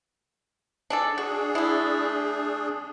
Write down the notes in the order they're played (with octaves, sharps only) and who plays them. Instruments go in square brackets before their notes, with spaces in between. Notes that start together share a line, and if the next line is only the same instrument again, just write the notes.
[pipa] D4 G#4 A4
[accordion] D4 G#4 [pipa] F#4
[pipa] A3 E4